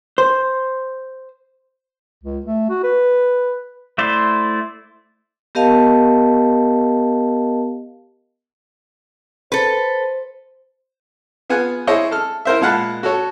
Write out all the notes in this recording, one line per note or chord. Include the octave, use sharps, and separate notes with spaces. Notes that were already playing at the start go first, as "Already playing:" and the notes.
C5
C#2
A3
F#4
B4
A3 E4 C5 D5
B3 G4 A#4 D#5 F5 A5
A4 B4 C5
B3 F4 G#4 F#5 G#5
E4 G#4 C5 C#5 D#5
A4 F6
E4 A#4 C5 E5
A#2 G#3 F5 F#5 A5 B5
F#4 A4 C#5